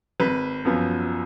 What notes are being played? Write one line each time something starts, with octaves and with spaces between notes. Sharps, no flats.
G#1 B4
F#2 F3 B3